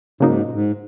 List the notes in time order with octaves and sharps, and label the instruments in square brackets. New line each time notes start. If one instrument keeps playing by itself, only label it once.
[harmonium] G#2 [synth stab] C#3 F#3 A#3 D#4
[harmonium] A#2
G#2